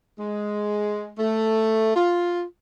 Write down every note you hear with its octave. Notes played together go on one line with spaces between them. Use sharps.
G#3
A3
F4